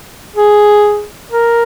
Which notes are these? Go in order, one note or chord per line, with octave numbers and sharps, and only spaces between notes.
G#4
A#4